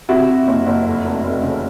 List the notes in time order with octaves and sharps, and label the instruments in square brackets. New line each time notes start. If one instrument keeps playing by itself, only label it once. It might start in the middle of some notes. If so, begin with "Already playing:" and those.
[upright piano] C3 E4 F#4
C3
F#1
F#1
F2
F1
F1
C#3